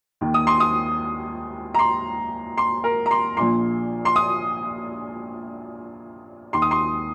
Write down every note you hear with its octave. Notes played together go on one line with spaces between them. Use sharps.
D#2 D#3
D#6
C6
D#6
A#5
C6
C6
A#4
A#5
C6
A#1 A#2 F3 C6
C6
D#6
D#2 D#3 C6
D#6
C6